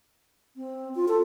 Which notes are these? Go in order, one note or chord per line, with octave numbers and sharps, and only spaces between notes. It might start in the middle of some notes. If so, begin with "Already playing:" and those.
C4
F4
A4